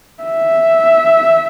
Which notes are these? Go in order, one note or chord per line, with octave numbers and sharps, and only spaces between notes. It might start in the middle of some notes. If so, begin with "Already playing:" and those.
E5